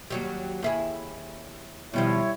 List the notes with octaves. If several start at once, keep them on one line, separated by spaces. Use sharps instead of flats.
D#2 F#3 G3
D#2 E4 G#4
B2 D#3 F3 G3 E4 C#5